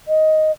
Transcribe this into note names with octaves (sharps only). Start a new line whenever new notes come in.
D#5